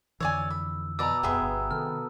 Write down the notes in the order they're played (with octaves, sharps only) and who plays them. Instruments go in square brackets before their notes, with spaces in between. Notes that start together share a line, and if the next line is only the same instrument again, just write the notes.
[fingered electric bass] F2 D3 E3 [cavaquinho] C#5 D5 G#5 [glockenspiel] E6
[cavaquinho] B5
[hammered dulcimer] B2 [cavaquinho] D5 D#5 [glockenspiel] A#5 B5 E6
[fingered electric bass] D1 F2 [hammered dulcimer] B3 [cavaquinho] G4 G#4 E5
[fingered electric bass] G1
[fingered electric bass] C3 D#3 [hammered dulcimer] A4 [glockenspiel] F6